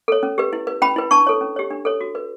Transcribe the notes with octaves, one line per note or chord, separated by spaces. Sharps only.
A4 C#5
C#4
G4 B4
E4
B4
C#4 G5 B5
E4 B4
D4 A5 C#6
A4 C#5
C#4
G4 C#5
D4
A4 C#5
F#4
B4